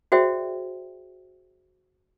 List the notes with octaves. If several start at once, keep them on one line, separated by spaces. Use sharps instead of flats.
F#4 G#4 C5 D5 E5 G5